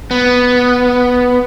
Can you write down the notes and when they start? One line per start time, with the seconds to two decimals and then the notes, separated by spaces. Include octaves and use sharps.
0.11 B3